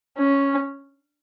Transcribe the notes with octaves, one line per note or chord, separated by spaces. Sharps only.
C#4